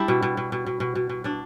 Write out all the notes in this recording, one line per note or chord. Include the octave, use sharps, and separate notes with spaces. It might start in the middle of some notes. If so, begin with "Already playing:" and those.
Already playing: G3 D4 E4
B2
B2
B2
B2
B2
B2
B2
B2
B2 D4